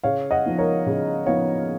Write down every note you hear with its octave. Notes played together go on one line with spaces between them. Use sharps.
C#3 C#5 F5
D#5 F#5
F3 B3 D#4
A#4 C#5
C#3
F3 B3 D#4 C#5 F5